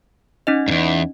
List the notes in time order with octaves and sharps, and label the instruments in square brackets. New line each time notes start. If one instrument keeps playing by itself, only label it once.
[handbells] C#4 D#4 D#5
[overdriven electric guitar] E2 G2